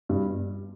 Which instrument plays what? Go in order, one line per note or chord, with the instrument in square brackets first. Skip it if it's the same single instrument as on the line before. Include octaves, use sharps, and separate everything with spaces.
[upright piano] G2